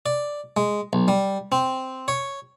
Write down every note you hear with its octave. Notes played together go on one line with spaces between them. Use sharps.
D5
G#3
B1
G3
C4
C#5